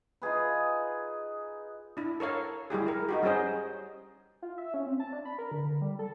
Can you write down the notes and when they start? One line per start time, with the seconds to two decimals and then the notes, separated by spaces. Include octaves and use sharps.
0.22 D#4 F4 G#4 B4
1.97 D4 E4
2.20 A4 A#4 C#5 F5
2.70 G3 E4 G4 G#4
2.87 E4 A#4
3.09 D#4 F#4 G4
3.23 G3 C#4 G#4 C5 D#5
4.42 F4
4.58 E5
4.74 C#4
4.86 C4
5.00 A5
5.13 D4
5.25 B5
5.39 A#4
5.51 D3
5.65 D3
5.81 G3
5.99 A4